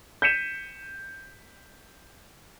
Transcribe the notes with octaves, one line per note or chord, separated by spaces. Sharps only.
G6 B6 C#7 D#7 E7